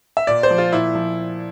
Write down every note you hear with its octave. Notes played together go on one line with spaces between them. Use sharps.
E5
A#2 D5
C5
F3
F4
A#2 E4
F3